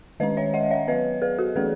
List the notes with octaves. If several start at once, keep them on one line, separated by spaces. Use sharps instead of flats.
D#3 G#3 C#4 B4 D#5
C#5 E5
D#5 F#5
C#5 E5
F#3 B3 B4 D#5
G#4 B4
F#4 A4
E3 A3 C#4 G#4 B4